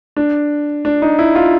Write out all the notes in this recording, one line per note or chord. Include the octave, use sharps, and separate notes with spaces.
D4
D4
D#4
E4
F4